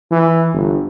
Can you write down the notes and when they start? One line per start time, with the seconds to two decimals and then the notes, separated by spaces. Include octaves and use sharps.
0.11 E3
0.54 G1